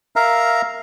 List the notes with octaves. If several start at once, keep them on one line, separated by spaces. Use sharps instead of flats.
A#4 E5 F5 A#5